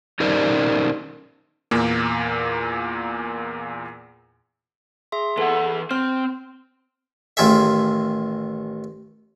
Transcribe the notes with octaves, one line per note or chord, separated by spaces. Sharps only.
C#4 D#4 G4 A#4 C5 D5
E2 A#2 A#3
G#4 E5 C6
E3 A4 F#5
C4 C5 F6
A1 D#3 F4 G#4 E5